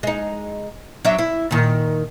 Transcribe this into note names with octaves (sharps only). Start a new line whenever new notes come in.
G#3 D#4
F#3 D4 E5
E4
A#2 D#3